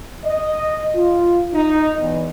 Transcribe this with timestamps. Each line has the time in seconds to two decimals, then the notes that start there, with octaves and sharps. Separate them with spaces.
0.25 D#5
0.95 F4
1.53 D#4
2.00 E2